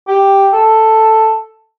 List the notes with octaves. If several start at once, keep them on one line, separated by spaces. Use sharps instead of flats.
G4
A4